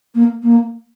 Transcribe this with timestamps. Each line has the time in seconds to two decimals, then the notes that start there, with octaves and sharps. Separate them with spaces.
0.15 A#3
0.43 A#3